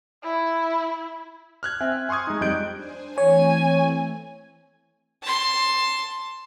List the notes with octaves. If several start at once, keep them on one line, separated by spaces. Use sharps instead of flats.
E4
F6 F#6 G#6
C4 E5 G#5
G#5 C6 C#6 D#6 G#6
G#3 D#4
F2 G3 D#5 F#6 G6 D7
D4 C5 G#5
E3 A3 C4 C#5 G#5
A5 C6